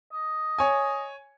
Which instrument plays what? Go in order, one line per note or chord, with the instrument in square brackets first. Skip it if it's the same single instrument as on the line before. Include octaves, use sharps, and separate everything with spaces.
[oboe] D#5
[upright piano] C#5 G#5